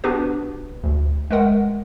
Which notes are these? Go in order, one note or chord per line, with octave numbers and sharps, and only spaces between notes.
B3 D4 F#4 G4 B4
D2
G#3 A3 A#4 F#5